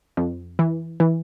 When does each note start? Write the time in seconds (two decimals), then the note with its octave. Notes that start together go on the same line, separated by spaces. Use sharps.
0.17 F2
0.59 E3
1.00 E3